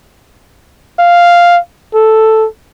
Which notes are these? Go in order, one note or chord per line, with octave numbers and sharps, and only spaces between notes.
F5
A4